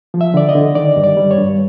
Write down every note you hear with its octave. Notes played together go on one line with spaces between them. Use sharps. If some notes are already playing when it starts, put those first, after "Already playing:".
F3
E5
D3 D5
D#5
D3
D#3 D5
G2
D5
G3
C#5
G2